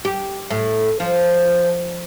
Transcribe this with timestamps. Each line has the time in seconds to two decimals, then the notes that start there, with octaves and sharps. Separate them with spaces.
0.05 G4
0.50 A2
1.00 F3